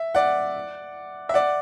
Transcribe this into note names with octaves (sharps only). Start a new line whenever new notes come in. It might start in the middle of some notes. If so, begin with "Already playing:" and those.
Already playing: E5
D5 F#5
E5
D5 F#5